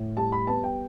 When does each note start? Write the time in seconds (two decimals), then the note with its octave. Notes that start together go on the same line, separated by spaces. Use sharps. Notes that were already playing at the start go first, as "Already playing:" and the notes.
Already playing: A2
0.17 G3 A5
0.32 B5
0.47 B3 A5
0.64 G5